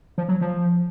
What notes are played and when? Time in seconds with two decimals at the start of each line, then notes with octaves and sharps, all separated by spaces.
0.18 F3
0.28 F#3
0.41 F3